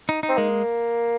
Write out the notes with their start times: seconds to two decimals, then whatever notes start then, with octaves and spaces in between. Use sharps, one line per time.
0.09 D#4
0.23 D#4
0.29 C4
0.37 G#3 A#3